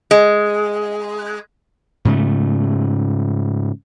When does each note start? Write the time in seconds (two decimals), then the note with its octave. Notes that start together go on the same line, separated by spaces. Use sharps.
0.11 G#3
2.05 G#2 C#3 A3